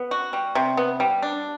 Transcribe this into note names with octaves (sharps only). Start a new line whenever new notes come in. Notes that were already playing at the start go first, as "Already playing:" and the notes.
Already playing: B3
F#4
G3
C3
B3
G3
D4